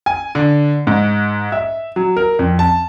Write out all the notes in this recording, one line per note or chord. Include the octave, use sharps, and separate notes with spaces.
G#5
D3
G#2
E5
F#3
A#4
F2
A5